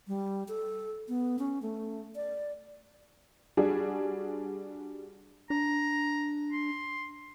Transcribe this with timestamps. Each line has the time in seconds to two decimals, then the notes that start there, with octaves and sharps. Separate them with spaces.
0.08 G3
0.48 A4
1.08 B3
1.39 C#4
1.62 A3
2.16 D5
3.57 G3 D4 F#4 G#4
5.50 D4 A#5
6.52 C6